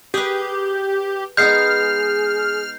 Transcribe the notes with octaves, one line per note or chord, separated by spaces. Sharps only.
G4 G#4 B4
G#3 B3 D#4 G#4 F6 G6 C7